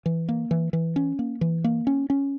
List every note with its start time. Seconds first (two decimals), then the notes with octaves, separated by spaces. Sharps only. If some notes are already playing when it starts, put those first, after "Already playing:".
0.06 E3
0.29 A#3
0.51 E3
0.73 E3
0.96 C#4
1.19 A#3
1.41 E3
1.64 A#3
1.87 C#4
2.10 C#4